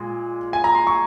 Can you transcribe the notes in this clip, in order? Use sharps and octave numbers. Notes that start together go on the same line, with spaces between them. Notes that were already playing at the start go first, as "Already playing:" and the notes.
Already playing: A#2 G#3
G#5
A#5
C6
C#6